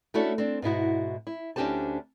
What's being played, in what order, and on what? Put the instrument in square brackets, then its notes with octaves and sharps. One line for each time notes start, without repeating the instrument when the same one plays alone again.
[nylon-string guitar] A3 C#4 D4 E4 F#4 A4
C4 D4
G#2 B2 E4 F#4
E4
D2 C#4 D4 G4 C5 A5